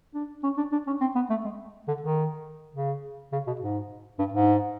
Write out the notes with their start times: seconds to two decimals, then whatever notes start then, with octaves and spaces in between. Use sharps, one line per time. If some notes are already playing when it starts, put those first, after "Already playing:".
0.14 D4
0.43 C#4
0.57 D4
0.72 D4
0.87 C#4
1.01 C4
1.15 B3
1.30 A3
1.45 G#3
1.88 D3
2.02 D#3
2.74 C#3
3.32 C#3
3.47 B2
3.61 G#2
4.19 G2
4.33 G#2